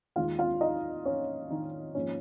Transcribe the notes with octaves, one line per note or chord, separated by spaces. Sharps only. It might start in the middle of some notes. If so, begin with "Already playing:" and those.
D#2 D#3 G#3 F4 F5
F4 F5
D#4 D#5
C#4 C#5
D#3 D#4
G#2 F3 A#3 C#4